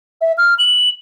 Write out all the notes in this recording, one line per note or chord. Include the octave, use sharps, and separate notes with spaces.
E5
F6
F#7